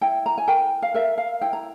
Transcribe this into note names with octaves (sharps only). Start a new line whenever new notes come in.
E4 G5
A#5
G#5
A#4 G5
F5
A#4 E5
F5
E4 G5
A#5